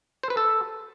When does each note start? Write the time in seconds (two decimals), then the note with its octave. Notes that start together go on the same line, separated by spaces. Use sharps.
0.23 C5
0.30 B4
0.37 A4